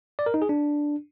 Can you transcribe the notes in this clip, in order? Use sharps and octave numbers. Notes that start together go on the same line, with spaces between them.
D5
A#4
D#4
G#4
D4